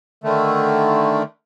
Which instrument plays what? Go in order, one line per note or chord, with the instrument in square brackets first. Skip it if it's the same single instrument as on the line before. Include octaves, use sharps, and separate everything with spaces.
[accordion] D3 D#3 A3